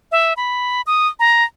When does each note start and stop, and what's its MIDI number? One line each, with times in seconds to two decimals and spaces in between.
0.12 0.33 76
0.37 0.81 83
0.87 1.08 87
1.19 1.44 82